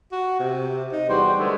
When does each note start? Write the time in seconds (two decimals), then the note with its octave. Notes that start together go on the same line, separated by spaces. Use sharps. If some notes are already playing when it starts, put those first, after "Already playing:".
0.12 F#4
0.40 C3
0.93 D#4
1.09 E2 G3 F#4 C5
1.38 D3 G#3 A3